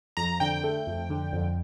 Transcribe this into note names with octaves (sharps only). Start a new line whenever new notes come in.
F2 A#5
D3 G5
A3
F2
D3
F2